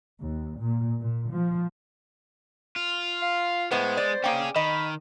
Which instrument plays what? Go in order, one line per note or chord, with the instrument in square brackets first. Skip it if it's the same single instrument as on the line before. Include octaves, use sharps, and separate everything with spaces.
[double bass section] D#2
A#2
A#2
F3
[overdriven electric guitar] F4
[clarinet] F5
[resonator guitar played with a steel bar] A2 B3 [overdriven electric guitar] G#3 [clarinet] C5
[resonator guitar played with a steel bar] D5
[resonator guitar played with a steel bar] A#3 G5 [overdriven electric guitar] C#4 G#4
[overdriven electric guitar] D#3 [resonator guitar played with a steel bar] D#5 [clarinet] B5